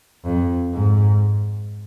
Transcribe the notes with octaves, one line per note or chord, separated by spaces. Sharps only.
F2
G#2